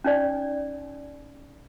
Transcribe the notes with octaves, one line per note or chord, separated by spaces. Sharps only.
C#4 D#4 D5